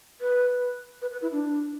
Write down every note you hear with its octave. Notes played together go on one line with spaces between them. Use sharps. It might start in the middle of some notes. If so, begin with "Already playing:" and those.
B4
B4
B4
E4
D4